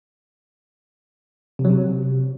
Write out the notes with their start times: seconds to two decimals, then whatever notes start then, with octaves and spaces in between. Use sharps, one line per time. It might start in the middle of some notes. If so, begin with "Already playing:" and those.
1.59 C3
1.65 F#3
1.70 C3